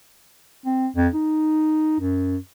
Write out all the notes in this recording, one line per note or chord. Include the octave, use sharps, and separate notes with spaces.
C4
F2
D#4
F#2